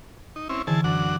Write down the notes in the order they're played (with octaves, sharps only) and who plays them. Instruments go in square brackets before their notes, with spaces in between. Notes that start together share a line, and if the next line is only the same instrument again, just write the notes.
[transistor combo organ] D#4
C4 C#4 E4
[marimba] D3 E3 [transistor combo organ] E4 G#4 A5
[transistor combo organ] F#2 D4 F#5